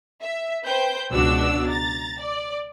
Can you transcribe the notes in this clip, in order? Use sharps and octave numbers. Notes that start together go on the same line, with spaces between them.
E5
B4 C5 G5 G6
C#2 B2 D4 F#4 D5 E6
A#5 A6
D5